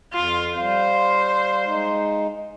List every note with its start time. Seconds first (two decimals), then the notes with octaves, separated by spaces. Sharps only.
0.13 F2 F4
0.58 G3 C5 F5
1.65 G#3 D#4